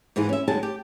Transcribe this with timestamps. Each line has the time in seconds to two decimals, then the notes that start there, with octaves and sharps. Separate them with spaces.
0.16 G#2 E3 E4 G#4
0.29 C#4 E5
0.48 D2 G2 F#3 G#3 G#4 A5
0.63 G4